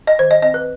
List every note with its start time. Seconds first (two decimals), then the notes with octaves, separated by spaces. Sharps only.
0.07 D#5
0.19 D#3 C5
0.31 D#5
0.42 C4 D#5
0.54 B4